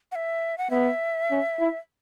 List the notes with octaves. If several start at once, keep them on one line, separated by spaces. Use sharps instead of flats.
F#5
E5
F#5
B3 E5
C#4
E4